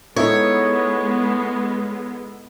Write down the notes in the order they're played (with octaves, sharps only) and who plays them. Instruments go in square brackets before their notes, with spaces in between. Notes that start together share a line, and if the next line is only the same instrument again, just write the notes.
[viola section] G#3 B3 [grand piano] A3 D#4 E4 [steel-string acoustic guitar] C#5